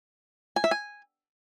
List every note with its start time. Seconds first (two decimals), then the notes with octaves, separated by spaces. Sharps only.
0.56 G#5
0.64 E5
0.71 G#5